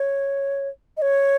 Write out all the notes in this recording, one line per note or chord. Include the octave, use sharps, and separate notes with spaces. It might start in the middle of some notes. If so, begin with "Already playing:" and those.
Already playing: C#5
D#5
C#5